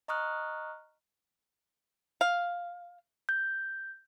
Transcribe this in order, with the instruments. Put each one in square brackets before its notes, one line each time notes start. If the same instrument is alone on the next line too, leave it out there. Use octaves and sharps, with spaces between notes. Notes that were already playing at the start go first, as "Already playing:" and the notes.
[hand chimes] D#5 A#5 C#6 D#6 F6 F#6
[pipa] F5
[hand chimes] G6